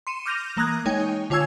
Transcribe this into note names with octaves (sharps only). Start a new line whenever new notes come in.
C6 C#7 D#7 E7
D6 F6 G6 A#6 D#7 F7
E3 A#3 A#5 D#6 F#6 G#6
G#3 D#4 C#5 G5 G#5
D3 F4 C#5 G#5 E6 G#6